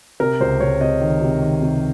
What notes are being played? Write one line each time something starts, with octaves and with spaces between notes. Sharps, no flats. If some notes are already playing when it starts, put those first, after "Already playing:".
C3 A#4
C#2 C5
C#2 C#5
C3 D#5
D#3
C3
D#3
C3